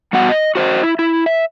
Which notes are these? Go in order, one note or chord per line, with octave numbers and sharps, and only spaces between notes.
G3 B3 F#4 F#5
D#5
F#4 C5 D5 D#5
E4
E4
E5